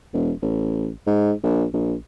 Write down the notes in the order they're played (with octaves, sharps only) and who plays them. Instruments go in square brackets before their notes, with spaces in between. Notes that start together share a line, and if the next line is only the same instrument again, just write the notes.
[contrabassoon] E1
A1
G#2
A#1
A#1